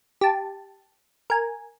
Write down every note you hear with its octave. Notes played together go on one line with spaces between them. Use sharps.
G4 A5
A#4 G#5